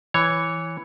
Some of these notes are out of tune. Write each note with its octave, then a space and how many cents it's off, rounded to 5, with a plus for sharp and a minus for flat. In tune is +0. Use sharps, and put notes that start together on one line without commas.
E3 +0 C#5 +0